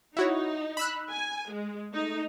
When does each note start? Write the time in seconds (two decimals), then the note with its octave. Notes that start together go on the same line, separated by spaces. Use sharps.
0.17 D#4 E4 F#4 C#5
0.77 B5 E6 F#6
1.10 G#5
1.51 G#3
1.92 A3 D#4